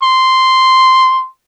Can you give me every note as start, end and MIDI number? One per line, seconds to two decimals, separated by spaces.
0.03 1.25 84